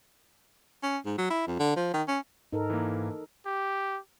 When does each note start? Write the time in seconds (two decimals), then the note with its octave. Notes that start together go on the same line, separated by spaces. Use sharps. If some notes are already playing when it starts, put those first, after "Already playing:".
0.83 C#4
1.05 G#2
1.18 F#3
1.31 E4
1.48 F2
1.59 D3
1.76 F3
1.93 D#3
2.08 C#4
2.53 G#2 D#4 A4 A#4
2.70 E3 A#3
3.46 G4